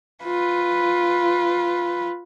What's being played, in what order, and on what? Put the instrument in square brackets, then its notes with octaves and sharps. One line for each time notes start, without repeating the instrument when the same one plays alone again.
[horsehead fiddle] F4 B4